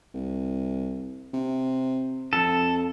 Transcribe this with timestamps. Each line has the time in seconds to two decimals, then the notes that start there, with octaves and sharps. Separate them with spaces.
0.14 C2
1.34 C3
2.33 F2 A4